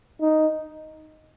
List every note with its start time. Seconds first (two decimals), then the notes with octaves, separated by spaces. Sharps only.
0.21 D#4